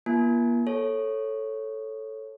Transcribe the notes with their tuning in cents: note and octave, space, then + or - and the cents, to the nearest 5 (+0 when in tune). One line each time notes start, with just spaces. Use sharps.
A#3 +40 F4 -35 G#5 +35
A4 +0 C#5 -10